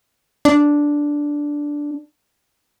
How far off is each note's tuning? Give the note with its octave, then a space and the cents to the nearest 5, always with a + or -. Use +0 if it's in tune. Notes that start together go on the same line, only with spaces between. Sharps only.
D4 -5